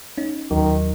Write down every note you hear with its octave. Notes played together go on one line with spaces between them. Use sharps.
C#4 D#4
D#2 D#3 F#3